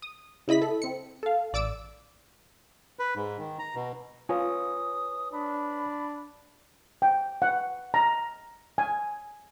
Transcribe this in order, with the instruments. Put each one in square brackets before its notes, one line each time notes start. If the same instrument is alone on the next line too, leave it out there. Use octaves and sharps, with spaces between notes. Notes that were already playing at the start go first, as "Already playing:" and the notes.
[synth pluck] D#6
C#3 E4 D#5 B5 B6
A4
C4 C#7
A4 F5
A1 D5 D6 E6 D7
[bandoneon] B4
G#2
D#3
A#5
B2
[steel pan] F4 [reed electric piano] B4 C#5 G#5 [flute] D#6
[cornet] D4 [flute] B5
[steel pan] G5
F#5
A#5
G#5